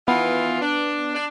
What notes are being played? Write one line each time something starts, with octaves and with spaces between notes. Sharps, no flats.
D#3 E3 B3 F4
D4
D4